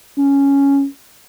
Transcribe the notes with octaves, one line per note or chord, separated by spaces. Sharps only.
C#4